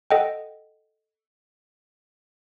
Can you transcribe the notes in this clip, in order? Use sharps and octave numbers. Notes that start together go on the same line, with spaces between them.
A4 D#5 F#5 G5